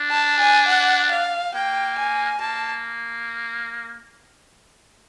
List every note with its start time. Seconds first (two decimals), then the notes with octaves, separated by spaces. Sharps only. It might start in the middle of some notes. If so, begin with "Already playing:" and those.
Already playing: D4
0.11 A5
0.39 G#5
0.68 F#5
1.11 F5
1.54 A#3 G5
1.98 G#5
2.40 A#3 A5